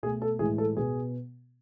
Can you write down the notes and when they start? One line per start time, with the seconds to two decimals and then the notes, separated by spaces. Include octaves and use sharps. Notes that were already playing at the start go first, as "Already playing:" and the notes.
0.03 B2 A3 G#4
0.22 A4
0.39 A2 E3 G#3 G#4
0.58 A4
0.77 B2 B3 G#4